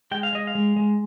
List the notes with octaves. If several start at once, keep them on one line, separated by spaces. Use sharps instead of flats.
G#3 G5
F5
G#3 D#5
F5
G#3
G#3